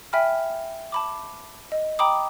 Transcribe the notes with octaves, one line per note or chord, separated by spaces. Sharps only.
E5 G5 G#5 B5 F6
A5 B5 D6
D#5
G5 A#5 B5 D6 D#6